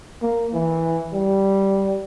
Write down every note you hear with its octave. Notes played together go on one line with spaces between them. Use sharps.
A#3
E3
G3